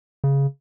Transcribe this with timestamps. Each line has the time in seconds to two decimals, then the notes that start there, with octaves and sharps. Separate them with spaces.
0.24 C#3